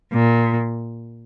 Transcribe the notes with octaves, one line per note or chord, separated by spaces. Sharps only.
A#2